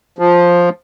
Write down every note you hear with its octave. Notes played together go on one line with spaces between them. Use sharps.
F3